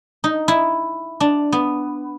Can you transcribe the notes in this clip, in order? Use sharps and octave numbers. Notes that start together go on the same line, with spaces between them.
D#4
E4
D4
B3